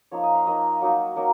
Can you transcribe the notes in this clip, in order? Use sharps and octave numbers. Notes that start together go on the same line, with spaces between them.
F3 A#3 D#4 C#5
D#5
F5
F3 A#3 D#4 D#5
F#3 A#3 D#4
F#3 A#3 D#4 A#4